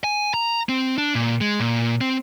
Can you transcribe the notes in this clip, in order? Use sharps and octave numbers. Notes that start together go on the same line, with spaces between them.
G#5
A#5
C4
D4
A#2
G#3
A#2
C4